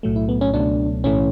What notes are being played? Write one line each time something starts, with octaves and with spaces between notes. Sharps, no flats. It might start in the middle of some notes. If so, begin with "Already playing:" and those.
B1 A2 F#3 A3
E4
B3
C#4
C#2 B2 F#3 A3 D4
B1 A2 E3 A3 C#4